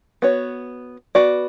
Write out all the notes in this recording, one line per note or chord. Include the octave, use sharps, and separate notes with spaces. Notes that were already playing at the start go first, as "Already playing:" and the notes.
B3 F#4 C#5
B3 F#4 B4 D5